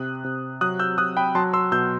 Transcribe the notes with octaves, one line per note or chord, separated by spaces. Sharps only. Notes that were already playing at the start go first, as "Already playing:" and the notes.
Already playing: C3 D#6 F#6
C3
F#3 D#6 F#6
E6 G6
F#3 D#6 F#6
G5 B5
F#3 A5 C6
C6 E6
B2 E6 G6